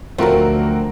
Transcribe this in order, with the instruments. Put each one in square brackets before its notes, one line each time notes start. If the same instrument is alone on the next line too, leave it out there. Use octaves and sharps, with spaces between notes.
[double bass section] D2 D3 [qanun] F3 F#3 [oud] A3 [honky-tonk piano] C4 F#4 A#4